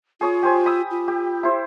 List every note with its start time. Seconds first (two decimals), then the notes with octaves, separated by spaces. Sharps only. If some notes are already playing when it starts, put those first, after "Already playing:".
0.21 F4 G#4 C#5 D#6
0.43 G4 C5 G#5
0.66 B5 D#6 E6
0.91 F4
1.08 G4
1.43 E4 C5